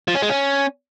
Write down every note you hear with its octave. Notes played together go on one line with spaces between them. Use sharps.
F3
C#4
G#3
C#4